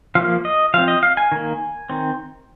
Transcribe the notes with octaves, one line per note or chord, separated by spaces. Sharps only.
F3 A#3 F5
D#5
F3 C4 F5
D#5
F5
G#5
D#3 A#3
D#3 C4